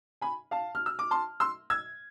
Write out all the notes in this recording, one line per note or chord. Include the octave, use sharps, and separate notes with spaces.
G#5 B5
F5 A5
F6
E6
D6
A5 C6
C6 E6
E6 G#6